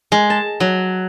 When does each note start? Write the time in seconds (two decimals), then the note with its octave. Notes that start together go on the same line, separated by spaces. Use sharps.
0.12 G#3
0.30 A5
0.60 F#3